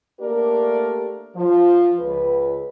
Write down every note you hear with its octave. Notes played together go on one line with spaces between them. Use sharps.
A3 A#3 D4 G4 A#4 D5
F3
C#2 B4